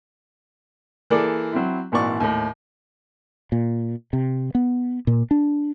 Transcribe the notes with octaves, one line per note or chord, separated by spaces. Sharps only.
E3 A#3 G#4 A4 D5
F#3 C4 E4
G#1 A#2 E3 F#4 D5 C#6
D#2 A2
A#2
C3
B3
A#2
D4